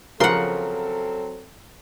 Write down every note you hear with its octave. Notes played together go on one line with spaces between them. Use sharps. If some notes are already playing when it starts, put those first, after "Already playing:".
C#3 F3 F#3 C4 A4 A#4 F#5 C6